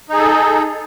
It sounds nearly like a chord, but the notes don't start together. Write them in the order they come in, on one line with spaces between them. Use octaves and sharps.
D#4 G#4 A4